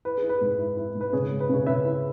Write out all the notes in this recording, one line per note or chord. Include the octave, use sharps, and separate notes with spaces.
E4 B4
G#4
E4
B4
G#2
E4
E4
G#2
B4
C#3 G#4 C#5
G#3
B4
C#3 G#4 C#5
C#3 B4 E5
E4